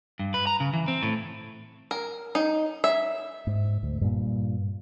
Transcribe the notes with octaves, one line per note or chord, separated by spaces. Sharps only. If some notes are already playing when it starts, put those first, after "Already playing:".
G2
B4
A#5
C#3
E3
C4
A2
A#4
D#4
E5
G#2
D2
G2 A#2